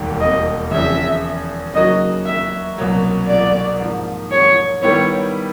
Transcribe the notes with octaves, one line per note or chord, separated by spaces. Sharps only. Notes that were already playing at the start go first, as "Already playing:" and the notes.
Already playing: E1 D#2 D#3 G3 A#3
D#5
E2 C#3 F3 E5
C#3 F#3 A#3 D#4 F#4 D#5
E5
C2 B2 F#3 A#3
D5
G#2 F3 A#3
C#5
D#3 G3 B3 E4 C#5